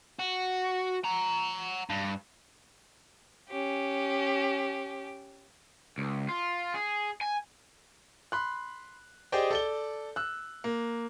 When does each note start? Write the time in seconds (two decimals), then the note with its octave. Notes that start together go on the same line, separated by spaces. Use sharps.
0.19 F#4
1.05 F#5 A#5
1.89 G2
3.48 C#4 G4
5.98 C#2
6.29 F4
6.74 G#4
7.21 G#5
8.32 B5 C6 F#6
9.32 G4 G#4 C5 D5 D#5 G5
9.51 A4 D5 G7
10.16 E6 F#6
10.64 A#3